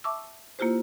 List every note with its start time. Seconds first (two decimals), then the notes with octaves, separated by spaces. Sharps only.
0.04 E5 A5 C#6 D6 E6
0.59 A#3 E4 F4 G4 C5